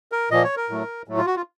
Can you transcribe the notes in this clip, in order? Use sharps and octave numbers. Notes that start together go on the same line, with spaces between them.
A#4
A#2 F3 A#3 D#5
C#5
A#4
A2 F#3 A3
A2 F#3 A3
F4
F#4
F4